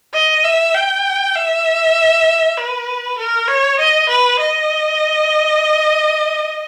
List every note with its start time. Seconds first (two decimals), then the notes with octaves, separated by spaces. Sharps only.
0.14 D#5
0.44 E5
0.74 G5
1.36 E5
2.57 B4
3.19 A#4
3.48 C#5
3.79 D#5
4.09 B4
4.40 D#5